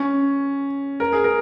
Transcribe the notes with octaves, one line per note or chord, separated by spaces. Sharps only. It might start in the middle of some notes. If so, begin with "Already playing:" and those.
Already playing: C#4
A#4
G#4
A#4